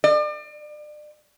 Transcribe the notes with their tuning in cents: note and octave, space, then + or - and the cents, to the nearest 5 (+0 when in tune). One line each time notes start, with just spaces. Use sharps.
D5 +35